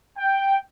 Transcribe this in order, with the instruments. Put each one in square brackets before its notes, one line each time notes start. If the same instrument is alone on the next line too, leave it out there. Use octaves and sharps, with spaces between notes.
[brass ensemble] G5